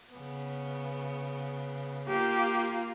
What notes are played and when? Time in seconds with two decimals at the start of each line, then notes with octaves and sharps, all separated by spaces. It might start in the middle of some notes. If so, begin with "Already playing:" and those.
0.13 C#3 B3
2.08 A#3 F4 G4